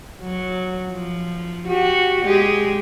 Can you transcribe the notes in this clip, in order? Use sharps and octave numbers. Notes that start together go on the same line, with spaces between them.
F#3
F3
F#4 G4
G#3 G4 G#4